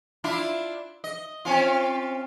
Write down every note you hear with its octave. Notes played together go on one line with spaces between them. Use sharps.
D4 E4 F4
D#5
C4 C#4 F4